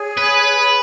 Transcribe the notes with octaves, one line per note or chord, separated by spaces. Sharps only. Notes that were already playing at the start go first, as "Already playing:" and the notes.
Already playing: G#4 C#5 G#5
B4